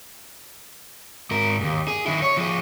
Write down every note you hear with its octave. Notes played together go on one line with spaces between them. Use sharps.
G#2 A#4
D#2 G#2
G#4
D#3 E4
C#5
F3 G#4